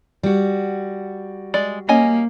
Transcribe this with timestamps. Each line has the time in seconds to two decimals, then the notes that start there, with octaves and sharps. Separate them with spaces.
0.23 G3 F#4
1.54 G#3 D5
1.89 A#3 C#4 D#5 G#5